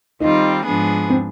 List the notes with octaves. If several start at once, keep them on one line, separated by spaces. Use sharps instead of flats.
D#3 G3 C4 D#4 F4
G#2 F3 B3 D4 G#4
C4